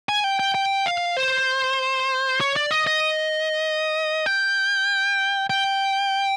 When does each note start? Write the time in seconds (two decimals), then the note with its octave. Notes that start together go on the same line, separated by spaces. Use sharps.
0.09 G#5
0.24 G5
0.40 G5
0.55 G5
0.86 F5
1.17 C5
2.41 C#5
2.56 D5
2.71 D#5
2.87 D#5
4.26 G5
5.50 G5